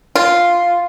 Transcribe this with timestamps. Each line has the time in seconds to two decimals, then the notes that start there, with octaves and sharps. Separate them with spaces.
0.15 F4